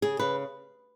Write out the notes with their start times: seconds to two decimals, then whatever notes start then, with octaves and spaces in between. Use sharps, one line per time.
0.02 C#3 G#4
0.19 C#3 B4